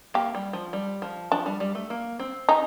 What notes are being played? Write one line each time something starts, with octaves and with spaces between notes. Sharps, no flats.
A#3 G4
G3
F3
G3
F3
F3 D4
G3
G3
A3
A#3
C4
D#4 G4